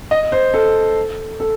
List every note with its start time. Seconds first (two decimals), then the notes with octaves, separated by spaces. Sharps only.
0.11 D#5
0.32 C5
0.54 A4
1.40 A4